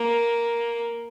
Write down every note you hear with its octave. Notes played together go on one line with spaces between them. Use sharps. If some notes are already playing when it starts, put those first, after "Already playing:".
Already playing: A#3